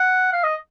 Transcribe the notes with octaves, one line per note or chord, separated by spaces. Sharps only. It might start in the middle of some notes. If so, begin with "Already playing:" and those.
Already playing: F#5
F5
D#5